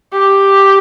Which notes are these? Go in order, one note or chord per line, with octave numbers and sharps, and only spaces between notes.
G4